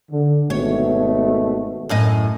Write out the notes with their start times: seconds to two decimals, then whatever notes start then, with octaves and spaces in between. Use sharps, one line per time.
0.11 D3
0.50 G#1 B2 A3 C#5
1.89 F#2 A2 D#5